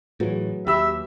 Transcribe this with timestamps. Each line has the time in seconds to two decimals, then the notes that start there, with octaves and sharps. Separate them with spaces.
0.20 A2 E3 F#3 G#4 B4
0.67 D#2 G4 E5 B5 E6